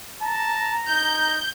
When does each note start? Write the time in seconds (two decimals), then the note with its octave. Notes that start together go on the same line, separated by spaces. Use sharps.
0.22 A5 A#5
0.89 D#4 G6